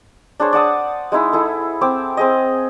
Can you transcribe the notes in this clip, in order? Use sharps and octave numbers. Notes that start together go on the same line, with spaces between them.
D4 G#4 C5 C#5
D5 F#5 A5 D#6
G#3 D#4 E4 G#4
E4 G#4 A4
C4 D6 E6
C4 G#4 D#5